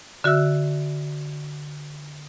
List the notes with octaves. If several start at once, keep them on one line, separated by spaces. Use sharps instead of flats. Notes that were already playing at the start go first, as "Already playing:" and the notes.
D3 F#4 E5 E6